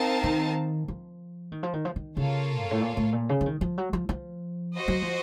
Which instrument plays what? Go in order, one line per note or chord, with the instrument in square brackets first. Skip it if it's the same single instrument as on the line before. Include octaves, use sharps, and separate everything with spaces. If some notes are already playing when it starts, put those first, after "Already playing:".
Already playing: [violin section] C4 D#4 A#4 F5 A5
[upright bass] D#3
F3
D#3
F3
D#3
F3
D#3
[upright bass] C#3 [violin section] A#3 F4 A4 C#5 F5
[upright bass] F#2
A2
A#2
A2
A#2
C#3
F3
D#3
F3
F#3
F3
F3
[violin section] F#4 C5 D#5
[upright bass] F#3
F3